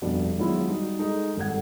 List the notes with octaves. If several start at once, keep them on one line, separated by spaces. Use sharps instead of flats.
F1 B2 G3 D4 F#4
D#3 F#3 G#3 B3 E4 F4
G3 D#4 F#4
G#3 A3 D#4 A4
G#1 G3 A4 F#5 G#6